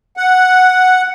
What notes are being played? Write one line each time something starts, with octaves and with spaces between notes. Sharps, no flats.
F#5